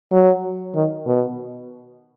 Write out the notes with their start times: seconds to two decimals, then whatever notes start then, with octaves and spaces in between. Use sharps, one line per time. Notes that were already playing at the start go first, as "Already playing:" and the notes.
0.12 F#3
0.75 D#3
1.06 B2